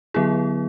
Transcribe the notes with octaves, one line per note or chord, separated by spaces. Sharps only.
D3 F#3 B3 E4 G#4